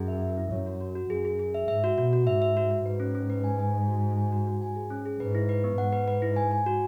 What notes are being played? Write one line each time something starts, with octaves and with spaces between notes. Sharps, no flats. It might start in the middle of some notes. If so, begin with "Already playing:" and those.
Already playing: F#2 G#4
E5
E5
E4
F#2 C#5
F#4
F#4
F#4
F#2 G#4
G#4
G#4
E5
G#2 E5
F#4
B2 F#4
F#4
G#2 E5
E5
F#4
F#4
G#2 B4
C#4
C#4
B4
G#5
G#5
G#5
F#4
F#4
G#5
F#4
F#4
G#5
G#4
C#4
G#4
G#2 B4
E4
B4
B3
G#2 F#5
B4
B4
E4
G#5
G#5
F#4